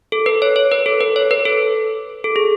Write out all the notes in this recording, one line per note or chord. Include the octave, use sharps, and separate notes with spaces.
A4
B4
C#5
C#5
B4
A4
B4
C#5
B4
A4
A4
G#4